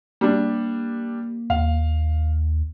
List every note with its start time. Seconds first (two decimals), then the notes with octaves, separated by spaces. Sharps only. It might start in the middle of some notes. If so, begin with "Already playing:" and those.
0.21 G3 A#3 D4
1.50 D#2 F5